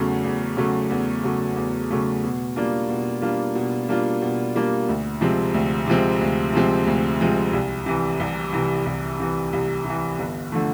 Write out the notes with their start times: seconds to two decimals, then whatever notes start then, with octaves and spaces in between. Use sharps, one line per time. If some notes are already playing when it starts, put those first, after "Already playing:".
Already playing: E2 C#3 F#3 A3
0.24 E2
0.57 C#3 F#3 A3
0.91 E2
1.24 C#3 F#3 A3
1.56 E2
1.90 C#3 F#3 A3
2.23 B2
2.56 G3 A#3 D4 F4
2.89 B2
3.22 G3 A#3 D4 F4
3.55 B2
3.89 G3 A#3 D4 F4
4.22 B2
4.55 G3 A#3 D4 F4
4.89 D2
5.21 C3 F3 G#3 C4
5.54 D2
5.87 C3 F3 G#3 C4
6.21 D2
6.53 C3 F3 G#3 C4
6.86 D2
7.21 C3 F3 G#3 C4
7.53 C2
7.86 C3 E3
8.20 C2
8.53 C3 E3
8.86 C2
9.20 C3 E3
9.53 C2
9.85 C3 E3
10.19 G1
10.52 D3 F3 A3